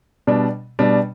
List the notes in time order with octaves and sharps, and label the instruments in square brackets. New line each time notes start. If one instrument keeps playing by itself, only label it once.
[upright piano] B2 G3 D4
B2 G3 D4